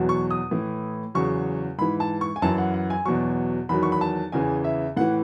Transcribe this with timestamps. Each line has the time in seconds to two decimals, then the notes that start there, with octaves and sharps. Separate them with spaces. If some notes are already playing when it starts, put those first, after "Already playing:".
Already playing: E2 B2 F#3
0.09 C#6
0.30 D#6
0.51 A2 E3
1.15 E2 C#3 F#3 C#6
1.78 G#2 E3 B5
2.00 A5
2.21 C#6
2.36 G#5
2.42 F#2 E3 A5
2.58 F#5
2.74 F#5
2.90 G#5
3.05 E2 B2 F#3 C#6
3.69 E2 D#3 F#3 B5
3.83 C#6
3.92 B5
4.01 A5
4.32 E2 C#3 E3 G#5
4.64 E5
4.97 A2 E3 F#5